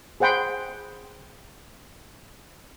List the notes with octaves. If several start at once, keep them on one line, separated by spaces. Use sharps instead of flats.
G#4 C5 F#5 G5 B5 C6